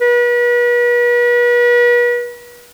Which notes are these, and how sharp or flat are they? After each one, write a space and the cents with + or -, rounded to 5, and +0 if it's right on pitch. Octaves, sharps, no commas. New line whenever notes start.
B4 -40